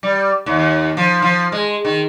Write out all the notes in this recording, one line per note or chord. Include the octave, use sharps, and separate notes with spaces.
G3
D#2
F3
F3
G#3
D#3